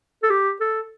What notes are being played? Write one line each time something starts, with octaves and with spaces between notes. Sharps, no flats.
A4
G4
A4